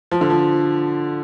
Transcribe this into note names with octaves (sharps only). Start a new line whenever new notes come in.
F3
D3
F3